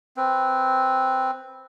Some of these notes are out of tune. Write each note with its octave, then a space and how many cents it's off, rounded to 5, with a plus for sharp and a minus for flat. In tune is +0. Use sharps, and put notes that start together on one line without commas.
C4 +0 B4 +0